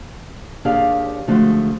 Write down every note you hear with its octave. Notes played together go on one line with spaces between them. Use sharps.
D#2 D4 G4 G#4 C#5 F5
D3 F3 G#3 A3 F#4